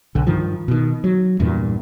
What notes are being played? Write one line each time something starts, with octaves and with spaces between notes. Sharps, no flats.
B1 D3
G2 D#3 F3
B2 D#3
F#3
E2 G2 A#2